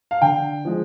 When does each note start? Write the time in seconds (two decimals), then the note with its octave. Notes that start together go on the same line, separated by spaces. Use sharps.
0.11 F5
0.22 D3 G5
0.65 F3 G#3